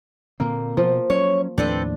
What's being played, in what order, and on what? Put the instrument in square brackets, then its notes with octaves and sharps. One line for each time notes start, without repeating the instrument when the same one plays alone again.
[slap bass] A#2 D3 C4 [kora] A#3
[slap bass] B2 [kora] F3
[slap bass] F#3 C#4 [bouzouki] C#5
[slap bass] D#2 A2 F3 [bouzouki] C4 A4 B4 [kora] D4